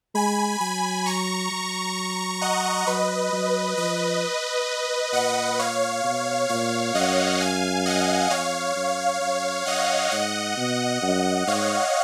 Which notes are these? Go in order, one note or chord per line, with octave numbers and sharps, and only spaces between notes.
G#3 G#5 B5
F#3 G#5 B5
A#5 C#6
F#3
D#5 F#5
F#3 B4 D#5
F#3
F3 B4 D#5
A#2 D#5 F#5
C#5 F5
B2
A#2 C#5 F5
F#2 D#5 F#5
F5 G#5
D#5 F#5
F2 C#5 F5
F#2
F#2
F#2 D#5 F#5
G#2 D#5 F#5
B2
F#2
G#2 C#5 F5